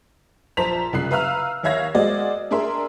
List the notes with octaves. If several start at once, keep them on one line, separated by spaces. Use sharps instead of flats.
A#1 C5 A5 A#5 B6 F7
C2 C#3 F#6 C7
B4 E5 F5 A#5 E6 F6
D#2 C#5 E5 F5 G#6 A#6
G#3 F#4 G#4 C5 D5 D#5
D4 G#4 A#4 E5 C6